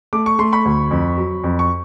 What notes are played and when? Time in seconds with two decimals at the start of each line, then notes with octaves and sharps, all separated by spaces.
0.13 A3 D6
0.26 C#6
0.39 A3 C6
0.53 B5 C#6
0.65 D2
0.91 F2
1.18 F#3
1.44 F2
1.59 C#6